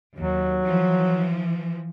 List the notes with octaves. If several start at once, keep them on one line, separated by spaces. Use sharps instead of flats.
D#2 F#3
E3 F3